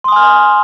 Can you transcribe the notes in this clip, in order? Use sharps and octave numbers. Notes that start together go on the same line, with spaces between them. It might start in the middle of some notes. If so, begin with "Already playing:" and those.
G#5 C6 D#6 F6